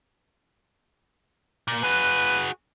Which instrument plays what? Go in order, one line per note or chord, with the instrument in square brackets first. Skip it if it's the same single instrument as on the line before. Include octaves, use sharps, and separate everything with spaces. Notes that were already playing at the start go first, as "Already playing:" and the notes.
[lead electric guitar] A#2
[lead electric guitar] F#4 G#4 [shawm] B4